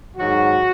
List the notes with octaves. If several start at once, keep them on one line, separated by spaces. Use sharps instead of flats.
G#2 D#3 F#3 F#4